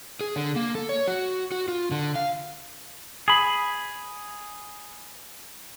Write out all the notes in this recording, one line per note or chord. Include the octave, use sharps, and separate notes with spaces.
G#4
D3
A#3
A4
C#5
F#4
F#4
F4
D3
F5
G#4 B5